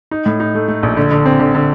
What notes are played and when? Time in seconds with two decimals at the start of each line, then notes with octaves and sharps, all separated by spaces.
0.11 D#4
0.26 A2
0.40 D#4
0.55 A3
0.68 A3
0.83 A#1
0.97 D3
1.11 D3
1.26 C4
1.40 D3
1.54 D3